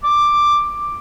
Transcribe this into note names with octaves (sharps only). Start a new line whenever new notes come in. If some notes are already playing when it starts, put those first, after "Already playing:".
D6